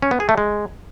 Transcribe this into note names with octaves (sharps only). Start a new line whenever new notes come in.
C#4
B3
G#4
A3
G#3